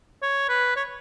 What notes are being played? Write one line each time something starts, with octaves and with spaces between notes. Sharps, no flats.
C#5
B4
C#5